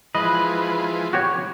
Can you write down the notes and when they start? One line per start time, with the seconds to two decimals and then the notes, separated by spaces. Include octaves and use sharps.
0.15 E3 F3 G#3 B4 D#5
1.13 F#4 G4 C#5